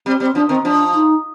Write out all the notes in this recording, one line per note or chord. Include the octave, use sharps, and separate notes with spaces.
G3 C4
G3 C4
F3 D4
D#3 C4
F3 D4
D#4